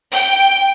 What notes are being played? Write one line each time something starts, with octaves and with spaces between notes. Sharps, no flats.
G5